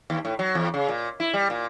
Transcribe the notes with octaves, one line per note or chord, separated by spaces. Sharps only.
D#2
A2
F#3
E2
C#3
A#2
E4
G3
A#2